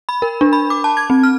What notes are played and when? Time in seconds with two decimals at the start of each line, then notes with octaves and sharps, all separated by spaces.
0.09 B5
0.22 A#4
0.41 D4
0.53 B5
0.70 D6
0.84 A5
0.97 G#6
1.10 C4
1.23 F6